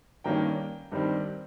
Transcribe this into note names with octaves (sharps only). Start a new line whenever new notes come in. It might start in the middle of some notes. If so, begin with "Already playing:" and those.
G2 D#3 A#3 C#4 G5 A#5
G2 D#3 G3 C4